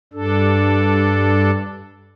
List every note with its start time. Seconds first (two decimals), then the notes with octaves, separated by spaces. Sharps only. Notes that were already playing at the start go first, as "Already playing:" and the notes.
0.13 G2 D4 A4